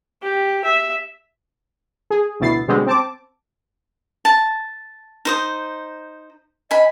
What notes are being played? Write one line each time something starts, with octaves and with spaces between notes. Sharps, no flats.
G4
E5
G#4
A1 D2 B2 E4 A6 C7
B2 D3 G3 G#3 C4
C4 A5 D6
A5
D#4 C5 D#6
D#5 G#5 B5